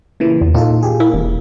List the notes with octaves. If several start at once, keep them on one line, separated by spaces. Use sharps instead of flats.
A#2 C#3 E3
E2
A#2 D#4 F4 A4
G4 G#4
A#3 E4
E1